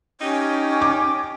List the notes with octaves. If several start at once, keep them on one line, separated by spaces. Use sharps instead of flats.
C#4 D#4 G4
D6